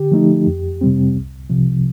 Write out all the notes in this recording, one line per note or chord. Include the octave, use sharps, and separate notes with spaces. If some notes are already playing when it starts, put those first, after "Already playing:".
Already playing: D3 G4
F3 A3 D#4
F2
C3 G3 C4
C2
C3 F3